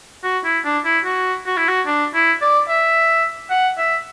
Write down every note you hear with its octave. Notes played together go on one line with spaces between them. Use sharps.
F#4
E4
D4
E4
F#4
F#4
E4
F#4
D4
E4
D5
E5
F#5
E5